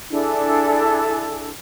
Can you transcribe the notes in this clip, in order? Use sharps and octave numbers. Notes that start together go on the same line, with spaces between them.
D4 E4 G#4 A4